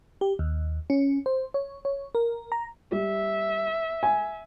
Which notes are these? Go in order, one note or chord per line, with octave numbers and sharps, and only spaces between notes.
G4
D#2
C#4
C5
C#5
C#5
A#4
A#5
G3 E5
G#5